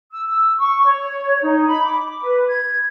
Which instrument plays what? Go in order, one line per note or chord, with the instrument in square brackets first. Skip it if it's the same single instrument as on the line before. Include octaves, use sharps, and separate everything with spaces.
[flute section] E6
E6
C#6
C#5
D#4
B5
D6
B4
G#6